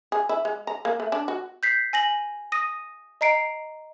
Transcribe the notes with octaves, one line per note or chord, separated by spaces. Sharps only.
G#4
E4
G#3
A#5
A#3
A3
D4
F#4
G6 B6 C7
G#5 A#6 F#7
D#6 A#6 D#7
D#5 A#5 C7 D7